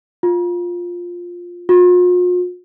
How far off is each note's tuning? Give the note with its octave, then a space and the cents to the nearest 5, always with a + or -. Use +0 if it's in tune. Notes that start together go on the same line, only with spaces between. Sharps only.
F4 +10
F4 +45